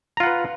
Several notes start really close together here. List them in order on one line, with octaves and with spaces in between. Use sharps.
A#5 F4 F#5 B4